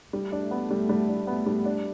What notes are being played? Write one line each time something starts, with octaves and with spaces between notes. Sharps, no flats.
G3 A3
D4
B3
G3
G3
D4
B3
G3
D4